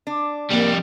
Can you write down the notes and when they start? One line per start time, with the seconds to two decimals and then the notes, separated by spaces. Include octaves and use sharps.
0.07 D4
0.51 F2 G3 A#3